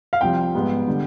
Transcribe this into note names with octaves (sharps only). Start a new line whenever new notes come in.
F5
C2 C3 F3 C4 G5
G#2 G3 B3
D3 G3